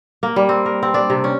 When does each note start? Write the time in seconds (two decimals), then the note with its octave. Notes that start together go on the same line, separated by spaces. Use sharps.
0.23 A#3
0.36 G3
0.49 C4
0.66 A#4
0.83 C4
0.94 D4
1.10 C3
1.24 C#4